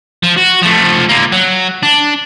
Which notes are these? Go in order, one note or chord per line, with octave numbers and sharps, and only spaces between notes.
F3
F#4
F3 A3
D3 A#3
F#3
D4